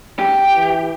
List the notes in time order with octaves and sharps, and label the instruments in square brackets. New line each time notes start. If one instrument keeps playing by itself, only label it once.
[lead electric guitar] G4
[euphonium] E3